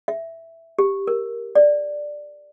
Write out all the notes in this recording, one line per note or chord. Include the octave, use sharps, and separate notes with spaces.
E5
G4
A#4
D5